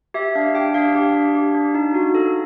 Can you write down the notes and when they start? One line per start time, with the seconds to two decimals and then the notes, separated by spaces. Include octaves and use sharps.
0.14 G4 E5
0.35 D4 F5
0.55 G4 G5
0.74 D4 F5
0.95 G4 F5
1.15 D4
1.35 G4
1.55 D4
1.75 D#4
1.94 F#4
2.14 A4